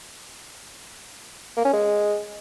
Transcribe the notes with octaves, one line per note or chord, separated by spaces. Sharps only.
A#3
C#4
G#3